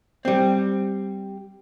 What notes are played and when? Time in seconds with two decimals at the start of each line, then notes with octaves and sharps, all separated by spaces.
0.25 G3 C4